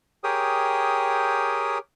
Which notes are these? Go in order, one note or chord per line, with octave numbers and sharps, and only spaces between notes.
G4 G#4 A#4 C#5 G5 D#6